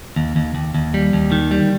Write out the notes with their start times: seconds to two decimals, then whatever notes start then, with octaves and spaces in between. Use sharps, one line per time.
0.16 D#2
0.36 D#2
0.55 D#2
0.74 D#2
0.94 G3
1.13 D#2
1.32 D#3
1.51 G3